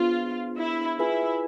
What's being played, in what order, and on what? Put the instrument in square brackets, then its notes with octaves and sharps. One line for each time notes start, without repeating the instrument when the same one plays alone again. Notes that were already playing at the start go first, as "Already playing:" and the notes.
Already playing: [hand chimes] B3 D4 G#4 C5 [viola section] F4
[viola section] E4
[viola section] E4 [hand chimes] F4 G#4 B4 E5 G#5